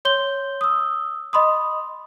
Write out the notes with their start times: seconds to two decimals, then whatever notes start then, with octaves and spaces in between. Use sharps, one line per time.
0.05 C#5 C6 G6 G7
0.61 D#6 E6
1.33 D#5 B5 C6 D#6